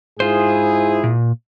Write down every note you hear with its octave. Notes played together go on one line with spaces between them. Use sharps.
G#2 E4 F4 G#4 C5
A#2